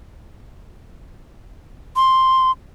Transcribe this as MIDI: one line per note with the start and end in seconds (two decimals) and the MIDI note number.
1.96 2.51 84